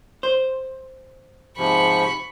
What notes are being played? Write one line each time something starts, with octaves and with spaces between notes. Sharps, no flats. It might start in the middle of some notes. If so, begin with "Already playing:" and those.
C5
G#2 C3 F3 B5 C#6